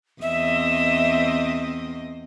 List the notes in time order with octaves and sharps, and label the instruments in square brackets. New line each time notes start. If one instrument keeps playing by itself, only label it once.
[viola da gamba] E2 C4 D#5 [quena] E5